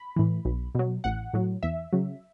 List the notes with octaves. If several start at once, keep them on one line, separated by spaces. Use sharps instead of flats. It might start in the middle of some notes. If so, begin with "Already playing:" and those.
Already playing: B5
A2 E3
B1
B2 F#3
A1 F#5
A2 F#3
E2 E5
C#3 F#3